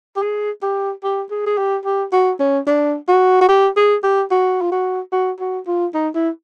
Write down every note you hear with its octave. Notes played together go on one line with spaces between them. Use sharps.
G4
G#4
G4
G4
G#4
G#4
G4
G4
F#4
C#4
D4
F#4
F#4
G4
G#4
G4
F#4
F4
F#4
F#4
F#4
F4
D#4
E4